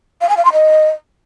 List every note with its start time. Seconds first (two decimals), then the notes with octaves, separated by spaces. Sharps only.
0.21 F5
0.29 G#5
0.37 F5
0.45 C6
0.53 D#5